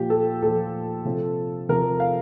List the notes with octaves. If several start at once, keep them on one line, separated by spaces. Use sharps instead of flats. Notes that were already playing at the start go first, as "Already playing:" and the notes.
Already playing: A#2 F3 G4
A4
A#2 F3 A4
C3 F3
C3 F3 A#4
F5